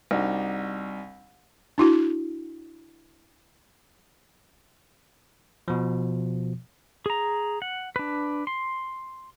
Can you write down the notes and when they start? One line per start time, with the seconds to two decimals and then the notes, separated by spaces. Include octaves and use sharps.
0.11 C2 D4 D#4 F#4
1.78 D4 E4 F#4
5.68 B2 F3
7.06 G#4 A#5
7.62 F#5
7.96 D4 B4
8.47 C6